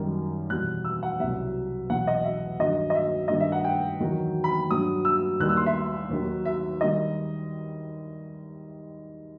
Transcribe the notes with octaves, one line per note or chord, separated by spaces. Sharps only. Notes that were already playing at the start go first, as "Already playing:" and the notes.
Already playing: F#2 D#3 G3
E2 B2 G3 F#6
E6
F#5
C2 B2 F#3 E5
E2 B2 F#3 F#5
D#5
E5
G2 D#3 F#3 D#5
D#5
E5
G2 D#3 G3 D#5
E5
F#5
G5
E2 D#3 F#3
B5
G2 F#3 D#6
E6
D#2 D#3 G3 F#6
E6
C6
E5
D#2 D#3 F#3
E5
D#3 G3 D#5